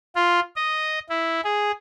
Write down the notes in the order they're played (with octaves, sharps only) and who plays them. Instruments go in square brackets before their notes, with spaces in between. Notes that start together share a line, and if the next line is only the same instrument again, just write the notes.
[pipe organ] F4
D#5
E4
G#4